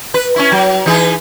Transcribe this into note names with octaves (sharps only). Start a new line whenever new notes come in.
B4
C#4 E4
F#3
E3 D#4 G#4